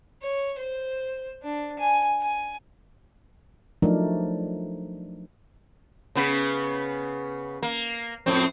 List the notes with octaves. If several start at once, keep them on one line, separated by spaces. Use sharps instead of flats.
C#5
C5
D4
G#5
G#5
F3 F#3 A3 D4 D#4 A#4
C#3 B3 B4
A#3
F2 A2 C4